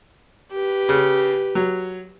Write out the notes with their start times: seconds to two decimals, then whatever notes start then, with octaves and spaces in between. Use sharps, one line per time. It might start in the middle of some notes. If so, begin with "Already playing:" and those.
0.52 G4 B4
0.89 C#3
1.55 F#3